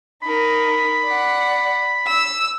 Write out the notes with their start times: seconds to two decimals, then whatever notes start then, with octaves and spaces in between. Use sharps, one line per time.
0.23 D#4 A#4 B5
1.05 D5 F#5
2.07 E6